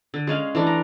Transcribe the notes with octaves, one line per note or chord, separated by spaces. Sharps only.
D3
G#3 C#4 F5
E3 A3 D4
A#5